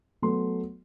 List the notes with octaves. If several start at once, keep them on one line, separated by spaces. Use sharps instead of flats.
F#3 A3 B3 C6